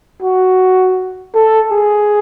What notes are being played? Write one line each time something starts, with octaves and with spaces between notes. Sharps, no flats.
F#4
A4
G#4